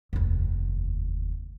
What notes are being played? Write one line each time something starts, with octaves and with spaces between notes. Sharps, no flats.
F1 D#2